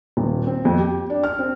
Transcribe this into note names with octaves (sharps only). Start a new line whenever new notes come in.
D#1
C4
F2
G4
D4
F6
C4